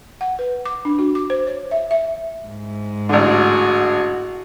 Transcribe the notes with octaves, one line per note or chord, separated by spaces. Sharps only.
F#5
B4
D6
D4
F#4
D6
C5
C#5
E5
E5
G#2
A1 D3 F#4 G#4